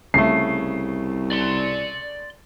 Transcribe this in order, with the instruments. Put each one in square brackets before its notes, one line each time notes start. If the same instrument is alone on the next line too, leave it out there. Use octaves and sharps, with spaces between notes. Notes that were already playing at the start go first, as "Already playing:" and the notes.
[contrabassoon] C2 [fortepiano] C#3 A3 [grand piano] C7
[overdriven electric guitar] D5 C6